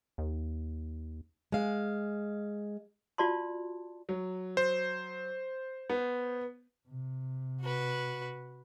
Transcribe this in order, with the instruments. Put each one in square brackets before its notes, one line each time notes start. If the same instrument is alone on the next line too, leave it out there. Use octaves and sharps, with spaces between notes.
[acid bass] D#2
[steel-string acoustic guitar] G#3 F5
[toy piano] F4 F#4 D5 A5 C6
[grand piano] F#3
[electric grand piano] C5
[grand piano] B3
[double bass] C3
[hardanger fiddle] F#4 B4